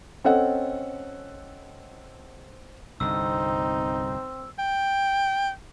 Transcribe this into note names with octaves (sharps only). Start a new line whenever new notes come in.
C4 C#4 A4 D#5 F#5
C2 G2 D3 C4 D#4 E6
G5